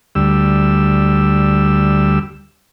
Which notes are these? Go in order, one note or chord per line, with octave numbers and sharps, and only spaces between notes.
D2 G3 E6